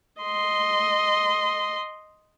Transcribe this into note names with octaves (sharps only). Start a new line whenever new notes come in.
D#5 C6